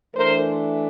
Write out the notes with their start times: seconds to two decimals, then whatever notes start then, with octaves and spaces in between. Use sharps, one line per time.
0.14 E3 A3 D4 A#4 C5